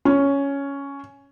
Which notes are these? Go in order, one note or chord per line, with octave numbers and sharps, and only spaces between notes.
C#4